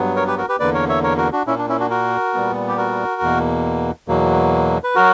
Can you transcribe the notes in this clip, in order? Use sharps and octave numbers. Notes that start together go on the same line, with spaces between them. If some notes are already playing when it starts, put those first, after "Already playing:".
Already playing: G2 F#3 B3
A#4 C#5
G4 B4
F#4 A#4
G4 B4
E2 D3 A#3 B4 D5
A#4 C#5
C#5 E5
A#4 C#5
F#4 A#4
D4 F#4
A#2 A#3 C#4 E4
D4
C#4 E4
D4 F#4
F#4 A#4
A#2 G3 B3
G4
F#4 A#4
E2 B2 A#3
E2 B2 F#3 A#3
B4
F#3 F#4 A#4